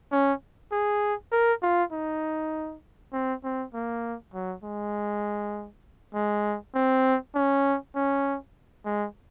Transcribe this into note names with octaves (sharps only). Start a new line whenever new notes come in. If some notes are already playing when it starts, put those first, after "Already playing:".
C#4
G#4
A#4
F4
D#4
C4
C4
A#3
F#3
G#3
G#3
C4
C#4
C#4
G#3